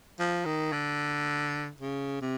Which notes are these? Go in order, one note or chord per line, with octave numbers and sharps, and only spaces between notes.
F3
D#3
D3
C#3
C3